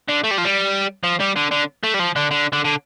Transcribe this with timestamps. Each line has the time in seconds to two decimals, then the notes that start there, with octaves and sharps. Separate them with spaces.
0.08 D3
0.24 A3
0.31 G3
0.38 F3
0.45 G3
1.04 F3
1.20 G3
1.36 D3
1.52 D3
1.84 A3
1.94 G3
2.00 F3
2.16 D3
2.31 D3
2.53 D3
2.64 D3